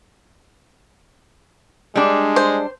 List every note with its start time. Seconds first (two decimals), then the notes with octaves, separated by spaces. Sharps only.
1.95 G3 G#3 D4
2.36 C5